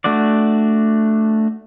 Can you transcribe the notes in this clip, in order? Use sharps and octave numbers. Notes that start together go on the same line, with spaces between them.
A3 D4 F#4 D5